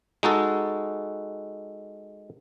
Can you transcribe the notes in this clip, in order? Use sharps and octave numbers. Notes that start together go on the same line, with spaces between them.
G#3 D#4 F#4 A4